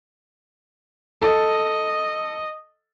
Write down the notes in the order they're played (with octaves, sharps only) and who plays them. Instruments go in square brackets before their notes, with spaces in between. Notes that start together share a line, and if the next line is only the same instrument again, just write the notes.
[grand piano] A4 A5 [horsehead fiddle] D#5